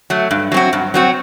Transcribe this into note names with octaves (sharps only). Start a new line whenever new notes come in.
F#3 A3
G2
F#3 C4 F#4
G2
F#3 C4 F#4